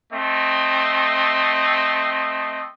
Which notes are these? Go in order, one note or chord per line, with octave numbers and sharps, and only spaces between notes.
A3 C4 D#5